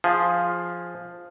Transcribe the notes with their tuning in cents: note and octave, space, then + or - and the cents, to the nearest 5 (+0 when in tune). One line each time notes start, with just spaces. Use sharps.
F3 +0 G#4 +0 F5 +0